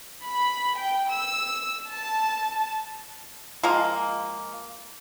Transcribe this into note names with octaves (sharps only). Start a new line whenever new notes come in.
B5
G5
E6
A5
F3 G#3 A#3